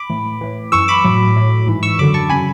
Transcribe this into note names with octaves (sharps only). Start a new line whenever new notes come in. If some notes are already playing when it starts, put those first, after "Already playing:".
Already playing: B5 D6
A2 E3
A2 E3
F#2 E3 C#6 E6
B5 D6
A2 F#3
A2 F#3
G#2 E3
C#6 E6
F#2 D3 F#3 B5 D6
A5 C#6
C#3 F#3 G#5 B5